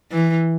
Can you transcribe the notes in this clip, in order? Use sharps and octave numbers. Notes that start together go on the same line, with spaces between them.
E3